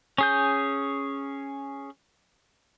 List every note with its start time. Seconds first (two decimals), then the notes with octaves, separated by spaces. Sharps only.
0.18 C#4 G#4 G6